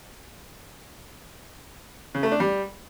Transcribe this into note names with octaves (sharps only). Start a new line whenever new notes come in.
C#3
A3
D4
G3